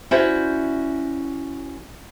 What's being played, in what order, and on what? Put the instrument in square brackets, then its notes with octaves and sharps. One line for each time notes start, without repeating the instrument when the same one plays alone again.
[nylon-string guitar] C#4 E4 F#4 C5 D5